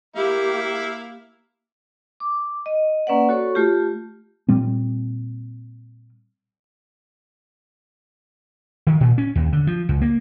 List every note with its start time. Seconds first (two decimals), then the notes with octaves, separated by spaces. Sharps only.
0.16 A#3 E4 G4 F5
2.20 D6
2.66 D#5
3.07 A#3 C#4 B4 D5 F#5
3.29 F#4 A4 C#5 C#6
3.55 A3 F4 G4
4.49 A#2 G3 C4
8.87 D#3
9.01 A#2
9.18 C#4
9.36 D#2
9.53 D3
9.67 F3
9.89 C#2
10.02 A#3